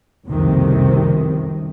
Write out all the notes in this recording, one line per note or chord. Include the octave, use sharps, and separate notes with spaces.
F#1 C2 F2 C3 D#3